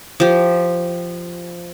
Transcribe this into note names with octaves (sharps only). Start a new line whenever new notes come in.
F3 G4